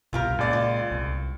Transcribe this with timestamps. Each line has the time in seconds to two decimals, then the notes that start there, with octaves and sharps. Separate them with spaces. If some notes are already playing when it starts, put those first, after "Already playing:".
0.13 C2 G2 B2 F4 G4 A#4
0.39 C#2 A#2 D5
0.53 F4
0.91 C2